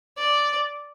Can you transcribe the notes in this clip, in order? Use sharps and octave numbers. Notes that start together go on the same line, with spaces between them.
D5